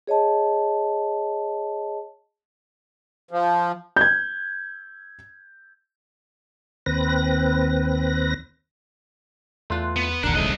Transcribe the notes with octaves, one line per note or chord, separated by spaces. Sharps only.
G#4 C#5 D#5 A5
F3
G6 G#6
D#2 C4 B4 A#6
E2 A3 F4 C6 F#6
B3
E1 A#1 D#2 D4 A#4 F#5 A#5 F#6
C2 G#3 A3 C#4 D#5